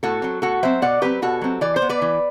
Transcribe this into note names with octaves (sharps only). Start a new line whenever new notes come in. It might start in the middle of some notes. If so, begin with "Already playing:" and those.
A2 F#4 A4
F#3 C4
A2 F#4 A4
F#3 C4 C5 E5
B2 D5 F#5
F#3 C4 G4 B4
B2 F#4 A4
F#3 C4
E3 D5
C5
B3
B4 D5
E3